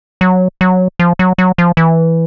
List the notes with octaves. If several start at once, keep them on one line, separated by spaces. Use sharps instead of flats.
F#3
F#3
F3
F#3
F#3
F3
E3